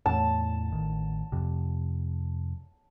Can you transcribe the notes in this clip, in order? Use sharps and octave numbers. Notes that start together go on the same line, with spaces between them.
E2 A2 A5
A1 D#3
F2 C3